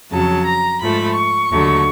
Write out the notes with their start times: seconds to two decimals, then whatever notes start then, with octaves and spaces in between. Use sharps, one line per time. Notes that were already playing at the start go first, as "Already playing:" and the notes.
0.10 F2 C#3 F#3 A5
0.46 A#5
0.81 G#2 F3 A3 B5
1.16 C#6
1.51 D#2 D3 F#3 A3